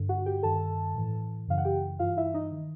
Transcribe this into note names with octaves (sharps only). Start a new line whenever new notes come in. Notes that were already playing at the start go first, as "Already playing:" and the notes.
Already playing: G2 D3
F#4 F#5
G4 G5
G2 D#3 A4 A5
A2 E3
F#2 C#3 E3 F5
F#5
G4 G5
G2 E3 F4 F5
E4 E5
D#4 D#5
D#3